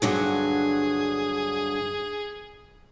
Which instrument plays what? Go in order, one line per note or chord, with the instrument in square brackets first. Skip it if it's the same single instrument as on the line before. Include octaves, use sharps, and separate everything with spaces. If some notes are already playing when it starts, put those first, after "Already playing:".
[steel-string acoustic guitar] G2 D3 F#3 [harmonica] G#4